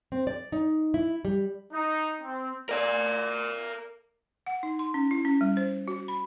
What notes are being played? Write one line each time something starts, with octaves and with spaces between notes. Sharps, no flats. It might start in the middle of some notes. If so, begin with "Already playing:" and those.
C4
D5
D#4
E4
G3
D#4
C4
A#4 D5
F#5
D#4
C6
C#4
E4
C#4
G3
C5
F#4
B5